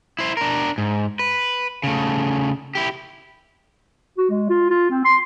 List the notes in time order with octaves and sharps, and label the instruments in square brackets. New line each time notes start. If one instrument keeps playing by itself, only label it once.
[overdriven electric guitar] E4 C5
D4 A#4
G#2
B4
C#3 A3
E4 G4
[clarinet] F#4
G#3
F4
F4
C4
C6